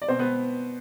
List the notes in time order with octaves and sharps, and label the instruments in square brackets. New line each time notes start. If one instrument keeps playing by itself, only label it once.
[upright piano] D5
B2 B3 C4 C5
B3 B4